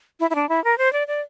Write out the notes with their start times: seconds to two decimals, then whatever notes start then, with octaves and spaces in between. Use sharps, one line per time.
0.20 E4
0.30 E4
0.35 D4
0.49 E4
0.64 A#4
0.78 C5
0.93 D5
1.08 D5